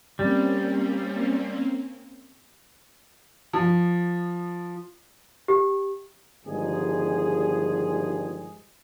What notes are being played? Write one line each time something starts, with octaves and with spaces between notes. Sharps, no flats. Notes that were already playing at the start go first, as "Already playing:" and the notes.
G3 A#3 C4 C#4
F3
G4
G1 D#3 F3 G3 G#3 G#4